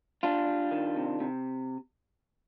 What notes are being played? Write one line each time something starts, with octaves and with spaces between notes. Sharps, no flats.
G3 D4 F4
G3
D#3
C3
C3